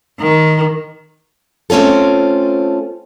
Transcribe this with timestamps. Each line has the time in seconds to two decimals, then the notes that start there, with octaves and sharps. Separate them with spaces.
0.20 D#3
1.70 A3 C4 C#4 F4 A4